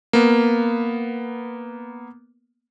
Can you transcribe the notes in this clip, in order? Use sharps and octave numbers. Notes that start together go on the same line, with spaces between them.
A#3 B3